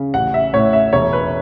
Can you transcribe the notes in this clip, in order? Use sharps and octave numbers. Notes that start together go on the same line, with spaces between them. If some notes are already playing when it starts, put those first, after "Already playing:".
Already playing: C#3
A1 F#5
E5
A2 C#5
E5
E1 C#5
B4